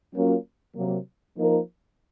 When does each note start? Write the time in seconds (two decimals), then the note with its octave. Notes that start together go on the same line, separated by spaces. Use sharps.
0.13 F#3 A#3 C#4 F4 A#4
0.75 C3 F#3 A#3
1.37 F3 A#3 D#4 A#4